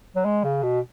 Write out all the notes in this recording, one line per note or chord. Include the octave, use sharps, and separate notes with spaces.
F#3
G#3
C#3
B2